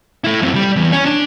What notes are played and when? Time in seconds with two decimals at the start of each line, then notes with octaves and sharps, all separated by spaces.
0.24 A3 E4
0.42 F#2 C4
0.55 G3
0.76 E2
0.92 C#4
1.06 D4